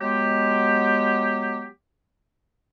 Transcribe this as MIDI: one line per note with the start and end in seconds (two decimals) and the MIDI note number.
0.01 1.68 54
0.01 1.68 56
0.01 1.68 59
0.01 1.68 67